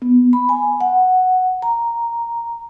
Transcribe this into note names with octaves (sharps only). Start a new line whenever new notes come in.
B3
B5
G#5
F#5
A#5